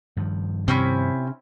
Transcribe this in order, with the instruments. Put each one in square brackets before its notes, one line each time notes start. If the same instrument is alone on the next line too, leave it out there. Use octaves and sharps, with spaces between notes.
[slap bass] G2 D#3 F3
[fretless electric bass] C3 [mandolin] C4 C#4 E4